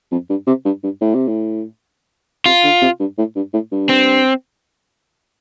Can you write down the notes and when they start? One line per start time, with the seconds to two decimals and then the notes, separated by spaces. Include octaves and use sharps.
0.12 F2
0.30 G2
0.47 C3
0.65 G2
0.83 G2
1.01 A2
1.15 C3
1.28 A2
2.45 C3 F4
2.64 D3
2.82 C3
3.00 G2
3.18 A2
3.36 G2
3.53 A2
3.72 G2
3.89 C4